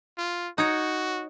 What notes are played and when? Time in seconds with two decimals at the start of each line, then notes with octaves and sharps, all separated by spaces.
0.17 F4
0.58 D#4 F#4 C#5